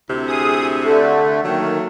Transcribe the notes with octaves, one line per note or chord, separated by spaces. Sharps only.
D2 C3 E4
G#4 D#6
D3 A3
D#3 F#3 A3 A#3